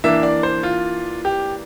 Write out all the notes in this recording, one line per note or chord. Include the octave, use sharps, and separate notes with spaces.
E3 A#3 D4 E5
D5
C5
F4
G4